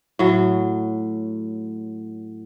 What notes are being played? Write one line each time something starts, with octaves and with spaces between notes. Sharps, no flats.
A2 F#3